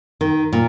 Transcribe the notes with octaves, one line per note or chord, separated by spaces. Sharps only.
D#3
A#2